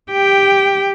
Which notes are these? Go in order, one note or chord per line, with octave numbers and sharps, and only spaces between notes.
G4 G5